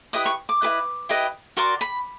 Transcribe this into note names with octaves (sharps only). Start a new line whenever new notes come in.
E4 G4 B4 D#5 D#6
C#6
D6
E4 G4 B4 D#5
E4 G4 B4 D#5
F#4 A#4 D5 C6
B5